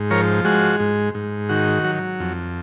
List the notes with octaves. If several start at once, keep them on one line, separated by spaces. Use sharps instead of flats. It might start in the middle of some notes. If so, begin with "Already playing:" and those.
Already playing: G#2
F3 A#4 C#5
G#3 F#4
G#2
G#2
D#3 F#4
F#3
F2